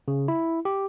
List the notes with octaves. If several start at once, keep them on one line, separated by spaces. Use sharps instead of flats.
C#3
E4
G4